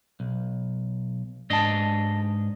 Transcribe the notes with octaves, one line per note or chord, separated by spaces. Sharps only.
B1
G#2 D4 D#5 A5 A#6